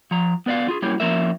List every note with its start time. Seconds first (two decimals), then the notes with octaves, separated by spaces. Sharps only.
0.11 F3 A#5
0.46 B3 B4 D5 E5 F5
0.66 D3 F4 G#4
0.82 F#3 G3 A#3 C#4 E4 G4
1.00 F3 A#3 C#4 E4 A#4 E5